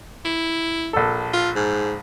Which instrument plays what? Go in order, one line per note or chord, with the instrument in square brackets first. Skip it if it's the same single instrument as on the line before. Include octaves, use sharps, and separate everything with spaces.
[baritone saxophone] E4
[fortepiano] A#1 A4
[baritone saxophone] F4
G#2